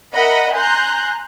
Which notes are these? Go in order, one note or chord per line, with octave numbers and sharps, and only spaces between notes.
A#4 D#5 E5 F#5 B5
G#5 A#5 C6 F#6 G6